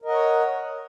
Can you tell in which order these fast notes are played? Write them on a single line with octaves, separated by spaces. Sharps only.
A#4 D#5 F#5 C#5